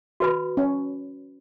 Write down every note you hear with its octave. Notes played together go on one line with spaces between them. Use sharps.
F#4 B4 B5
C#4